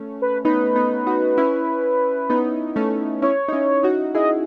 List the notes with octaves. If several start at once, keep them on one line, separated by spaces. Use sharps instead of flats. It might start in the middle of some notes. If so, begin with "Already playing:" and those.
Already playing: A3 C#4
B4
B3 D#4 B4
B3 D#4
D#4 F#4
C#4 E4
B3 D#4
A3 C#4
C#4 E4 C#5
D#4
C#4 E4
D#4 F#4
E4 G#4 D#5